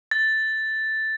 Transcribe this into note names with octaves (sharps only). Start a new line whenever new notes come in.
A6